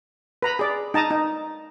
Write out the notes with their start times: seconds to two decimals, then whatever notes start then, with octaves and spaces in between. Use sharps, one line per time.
0.42 B4 A#5 B5
0.59 G#4 D5
0.94 D#4 A5 A#5 D#6
1.11 D#4